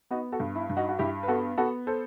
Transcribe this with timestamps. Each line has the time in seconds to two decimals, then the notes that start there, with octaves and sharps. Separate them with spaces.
0.11 B3 D#4 F#4
0.32 F#4 A4
0.40 G2
0.55 E4
0.70 G2
0.77 D#4 F#4
0.89 F#4
0.99 G2 E4 G4
1.23 B4
1.28 B3 F#4 A4
1.58 B3 F#4 A4
1.87 A4 C5